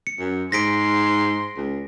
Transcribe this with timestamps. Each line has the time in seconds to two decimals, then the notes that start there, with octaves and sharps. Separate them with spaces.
0.07 C#7
0.20 F#2
0.52 G#2 C6 A#6 B6 D7
1.57 C#2